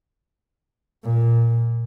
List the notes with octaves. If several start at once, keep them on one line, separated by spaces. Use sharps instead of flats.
A#2